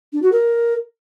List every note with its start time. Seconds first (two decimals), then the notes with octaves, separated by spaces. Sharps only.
0.13 D4
0.22 F#4
0.32 A#4